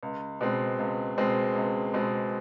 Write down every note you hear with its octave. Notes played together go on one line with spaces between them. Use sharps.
C#2
B2 G#3 C4
C#2
B2 G#3 C4
C#2
B2 G#3 C4